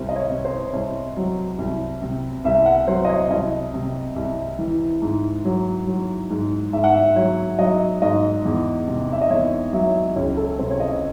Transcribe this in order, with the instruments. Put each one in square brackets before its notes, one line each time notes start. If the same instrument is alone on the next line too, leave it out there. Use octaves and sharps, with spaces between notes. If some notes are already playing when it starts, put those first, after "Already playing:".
Already playing: [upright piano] C2 C5
D#5
C#5
C3
C5
C2 C#5
F#3
C2
C3
C2 E5
F#5
F#3 C5
D#5
C#5
C2 D#5
C3
C2
E3
G#2
F#3
F#3
G#2
G#2 E5
F#5
E5
F#3 C#5
F#3 D#5
G#2 D#5
E2
C3
E5
D#5
E2 C#5
F#3 E5
C#2 C#5
A4
C3 C5
C#5
D#5